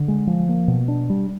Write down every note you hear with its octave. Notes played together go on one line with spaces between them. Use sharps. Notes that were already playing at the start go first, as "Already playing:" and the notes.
Already playing: D3
G#3
F3
A#3
B2
D4
G3